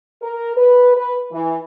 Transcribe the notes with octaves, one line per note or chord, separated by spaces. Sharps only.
A#4
B4
B4
E3